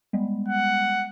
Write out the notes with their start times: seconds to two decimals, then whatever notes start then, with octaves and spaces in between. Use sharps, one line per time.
0.13 G3 G#3 B3
0.48 F#5